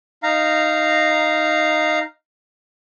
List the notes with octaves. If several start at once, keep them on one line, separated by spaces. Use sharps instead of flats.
D#4 F5 A#5